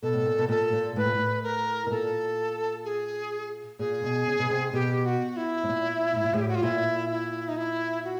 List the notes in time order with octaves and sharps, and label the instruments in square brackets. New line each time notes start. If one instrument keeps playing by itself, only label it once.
[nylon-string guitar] B2 [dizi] A4
[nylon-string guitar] A2
A#2
B2
[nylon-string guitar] A#2 [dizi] A4
[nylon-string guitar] A#2
[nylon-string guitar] A2 [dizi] B4
[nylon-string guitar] A#2
A2
[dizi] A#4
[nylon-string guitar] B2
[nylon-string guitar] A#2 [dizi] A4
[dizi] G#4
[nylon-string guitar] A#2 [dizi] G#4
[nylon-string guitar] B2
C#3
B2
C3
[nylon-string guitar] B2 [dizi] G4
[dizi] F#4
E4
[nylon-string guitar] A2
A#2
A2
A#2
[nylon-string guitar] A2 [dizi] G#4
[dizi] G4
F#4
F4
[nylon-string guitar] A#2 [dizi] E4
[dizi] E4
D#4
E4
F#4